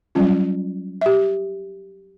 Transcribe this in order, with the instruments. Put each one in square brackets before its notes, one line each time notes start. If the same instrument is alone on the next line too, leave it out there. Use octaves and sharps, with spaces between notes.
[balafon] F#3 G3 C#4 F4
G4 E5